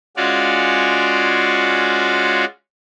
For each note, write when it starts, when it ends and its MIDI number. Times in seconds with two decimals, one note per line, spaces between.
0.17 2.45 56
0.17 2.45 61
0.17 2.45 65
0.17 2.45 66
0.17 2.45 74
0.17 2.45 77